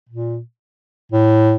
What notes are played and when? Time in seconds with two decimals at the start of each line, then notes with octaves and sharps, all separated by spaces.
0.09 A#2
1.12 A2